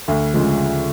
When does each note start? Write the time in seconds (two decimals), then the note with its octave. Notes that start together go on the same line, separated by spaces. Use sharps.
0.08 D2
0.34 C#3 F3 G#3